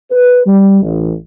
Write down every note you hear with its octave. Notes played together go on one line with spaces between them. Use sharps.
B4
G3
A1